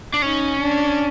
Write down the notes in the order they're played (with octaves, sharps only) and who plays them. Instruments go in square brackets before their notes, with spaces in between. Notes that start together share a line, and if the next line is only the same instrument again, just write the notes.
[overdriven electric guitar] D4
[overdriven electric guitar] C#4 [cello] D#4
[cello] D4